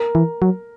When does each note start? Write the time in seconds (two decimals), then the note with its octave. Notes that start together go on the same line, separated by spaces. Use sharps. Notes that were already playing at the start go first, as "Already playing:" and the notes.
Already playing: A#4
0.15 E3
0.42 F#3